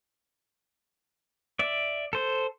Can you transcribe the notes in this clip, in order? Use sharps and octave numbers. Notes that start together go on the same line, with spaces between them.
D5 E5
A4 C5